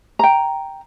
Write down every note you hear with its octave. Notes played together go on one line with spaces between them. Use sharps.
G5 A#5